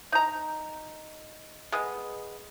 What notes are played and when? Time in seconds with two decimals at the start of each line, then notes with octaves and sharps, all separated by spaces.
0.12 D#4 A#5
1.72 G#3 B3